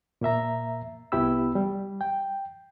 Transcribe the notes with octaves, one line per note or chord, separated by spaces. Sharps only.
A#2 A#3 E5 A#5
C2 B3 E4 G4 B5 E6
G3
G5